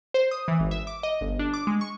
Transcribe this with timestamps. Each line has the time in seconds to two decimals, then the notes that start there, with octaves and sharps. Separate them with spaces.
0.14 C5
0.31 D#6
0.48 E3
0.60 G#1
0.71 E5
0.87 D6
1.03 D#5
1.21 G1
1.39 D4
1.54 D6
1.67 G#3
1.81 C#6